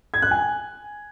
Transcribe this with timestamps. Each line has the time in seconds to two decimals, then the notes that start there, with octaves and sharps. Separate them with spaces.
0.14 G#6
0.22 F#6
0.31 G#5